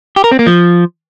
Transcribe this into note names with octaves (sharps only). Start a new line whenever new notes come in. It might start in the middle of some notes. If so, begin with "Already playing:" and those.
G4
A#4
C4
A#3
F3